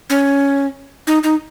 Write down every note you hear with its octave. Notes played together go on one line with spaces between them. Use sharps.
C#4
D#4
D#4